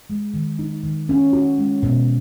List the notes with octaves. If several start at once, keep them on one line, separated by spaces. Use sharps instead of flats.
G#3
D#3
D#4
D#3
C#4
F#4
G#3
B2